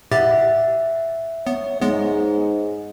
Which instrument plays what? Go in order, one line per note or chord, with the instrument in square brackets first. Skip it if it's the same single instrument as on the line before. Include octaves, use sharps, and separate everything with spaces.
[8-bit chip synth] A2 G4 A6 [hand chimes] E5 F#5
[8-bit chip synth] B3 [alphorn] C#5
[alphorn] G#2 [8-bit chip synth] G#3 B3